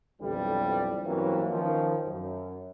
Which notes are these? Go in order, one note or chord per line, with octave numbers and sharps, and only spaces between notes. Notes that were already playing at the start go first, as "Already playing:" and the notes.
B1 F2 D3 E3 G3
G2 E3 F#3 A#3 C4 C#4
D#3 F3 C#4
F#2